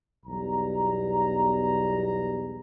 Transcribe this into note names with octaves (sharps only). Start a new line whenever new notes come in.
B1 E2 G3 A#5